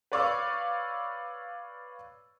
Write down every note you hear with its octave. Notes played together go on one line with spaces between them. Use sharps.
B4 C#5 D5 F5 C#6 E6